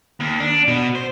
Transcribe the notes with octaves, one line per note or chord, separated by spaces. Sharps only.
D#2
D4
B2 B3
C5